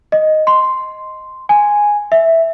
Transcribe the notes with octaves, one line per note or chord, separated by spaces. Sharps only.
D#5
C6
G#5
E5